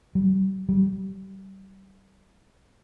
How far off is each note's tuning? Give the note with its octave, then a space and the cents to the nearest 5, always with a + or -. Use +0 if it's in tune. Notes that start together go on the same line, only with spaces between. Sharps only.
G3 -40
G3 -25